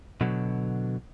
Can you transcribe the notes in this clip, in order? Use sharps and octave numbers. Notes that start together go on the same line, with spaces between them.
B2 D3 F#3